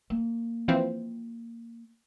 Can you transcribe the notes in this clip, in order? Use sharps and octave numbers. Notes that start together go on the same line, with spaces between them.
A#3
E3 F3 C4